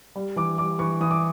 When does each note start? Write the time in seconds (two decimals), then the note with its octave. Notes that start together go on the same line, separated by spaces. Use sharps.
0.16 G3
0.36 E3 D6
0.58 G3 D6
0.79 E3 C#6
1.01 E3 D#6
1.11 D6